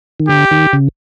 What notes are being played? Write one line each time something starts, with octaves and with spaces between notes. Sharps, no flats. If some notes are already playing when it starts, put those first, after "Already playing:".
D#3
D3 G4
D#3
C#3